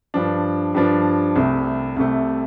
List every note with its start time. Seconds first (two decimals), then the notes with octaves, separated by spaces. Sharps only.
0.14 G2 F3 D4
0.75 G2 F3 D4
1.36 C2 C3 A3
1.97 C2 C3 A3